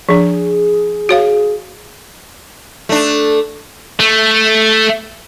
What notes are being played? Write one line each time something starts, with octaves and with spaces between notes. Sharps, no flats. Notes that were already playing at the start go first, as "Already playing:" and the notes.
F3 D4 G#4
F#4 C#5 F5
A3 D4
A3